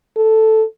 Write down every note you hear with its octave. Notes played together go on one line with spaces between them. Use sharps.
A4